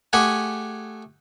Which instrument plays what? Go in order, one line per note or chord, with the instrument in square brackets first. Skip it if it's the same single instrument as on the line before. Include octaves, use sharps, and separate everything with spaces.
[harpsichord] A3 G4 G#4 F#5 G#5